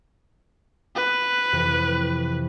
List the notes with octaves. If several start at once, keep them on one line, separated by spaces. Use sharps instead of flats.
B4
F2 C3 E3